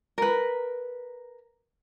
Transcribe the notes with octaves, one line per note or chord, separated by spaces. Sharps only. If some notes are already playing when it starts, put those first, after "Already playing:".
A#4 B4